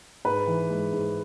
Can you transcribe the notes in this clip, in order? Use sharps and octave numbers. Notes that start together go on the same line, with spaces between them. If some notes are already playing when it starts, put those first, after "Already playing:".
G#2 B4
E3
G#3
G#2